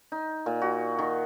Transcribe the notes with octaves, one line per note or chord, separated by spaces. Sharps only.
D#4
A#2
F#4
D#3